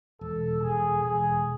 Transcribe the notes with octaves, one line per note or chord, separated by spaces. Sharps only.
E1 A4
E1 G#4
E1 G#4